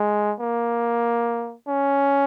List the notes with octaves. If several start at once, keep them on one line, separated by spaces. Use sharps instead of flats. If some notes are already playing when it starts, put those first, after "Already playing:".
Already playing: G#3
A#3
C#4